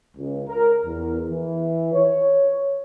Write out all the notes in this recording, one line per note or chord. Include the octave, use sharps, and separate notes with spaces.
C#2
A#4
E2
E3
C#5